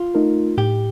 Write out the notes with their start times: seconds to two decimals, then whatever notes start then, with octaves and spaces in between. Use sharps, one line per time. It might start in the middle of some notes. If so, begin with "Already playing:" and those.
Already playing: F4
0.15 A3 D#4 A#4
0.57 A2 G4